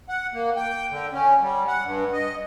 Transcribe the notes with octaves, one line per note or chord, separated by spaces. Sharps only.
F#5
A#3
G5
D3
C#4
G3
F#5
G2
D#5